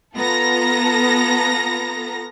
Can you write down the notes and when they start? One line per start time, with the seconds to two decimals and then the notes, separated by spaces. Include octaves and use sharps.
0.16 B3 F4 A4 A#5 A#6